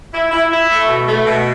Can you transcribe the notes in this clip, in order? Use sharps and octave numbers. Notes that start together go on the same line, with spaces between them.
E4
E4
E4
A3
B2
A3
B2